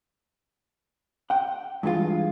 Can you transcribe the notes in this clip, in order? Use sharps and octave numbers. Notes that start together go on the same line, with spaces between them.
F#5 G5
G2 E3 G#3 F4